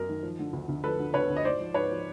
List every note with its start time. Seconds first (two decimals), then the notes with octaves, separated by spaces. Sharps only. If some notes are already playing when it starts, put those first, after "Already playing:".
Already playing: F#2 A#4
0.09 D#3
0.23 F3
0.39 D3
0.53 D2
0.68 D2
0.84 F3 A4 B4
0.99 D3
1.14 D2 B4 C#5
1.29 D2
1.36 D#5
1.45 G#2 C5 D5
1.60 F3
1.74 G#2 B4 C#5
1.90 F3